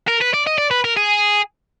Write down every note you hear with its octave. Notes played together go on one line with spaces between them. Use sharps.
A#4
B4
D5
D#5
D5
B4
A#4
G#4